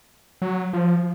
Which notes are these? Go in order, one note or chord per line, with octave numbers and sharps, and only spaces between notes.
F#3
F3